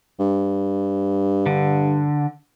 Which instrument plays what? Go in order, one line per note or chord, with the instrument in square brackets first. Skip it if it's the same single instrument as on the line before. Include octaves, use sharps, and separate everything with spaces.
[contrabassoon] G2
[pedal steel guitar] D3